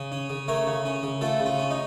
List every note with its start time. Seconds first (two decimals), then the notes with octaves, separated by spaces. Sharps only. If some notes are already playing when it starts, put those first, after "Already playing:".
Already playing: C#3
0.12 C#4
0.30 C#3
0.48 A3 A#4 C#5
0.67 C#3
0.85 C#4
1.03 C#3
1.21 A3 F4 A4
1.40 C#3
1.46 F4
1.58 C#4
1.70 D#4